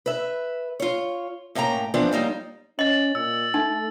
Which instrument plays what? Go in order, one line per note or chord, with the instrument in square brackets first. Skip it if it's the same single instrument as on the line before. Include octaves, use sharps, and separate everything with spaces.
[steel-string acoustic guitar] B4 E5
F4 C#5
A2 A#3 C#4 G5 A#5
E3 F3 B3 C4 D4
F#3 G3 A#3 D#4
[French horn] C#4 [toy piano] D#5 [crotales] A6 F#7
[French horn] A#2 [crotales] E6
[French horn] A3 [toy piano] D#4